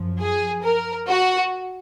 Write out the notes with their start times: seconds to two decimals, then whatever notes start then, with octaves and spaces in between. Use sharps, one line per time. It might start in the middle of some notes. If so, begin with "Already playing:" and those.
Already playing: F#2 F3
0.20 G#4
0.63 A#4
1.08 F#4